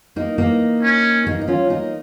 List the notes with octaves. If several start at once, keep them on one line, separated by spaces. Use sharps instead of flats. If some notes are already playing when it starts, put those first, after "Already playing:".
A#3 D#4
A#3 D#4
C#4
A#3 D#4
D#4
C#4 F4
A#3 D#4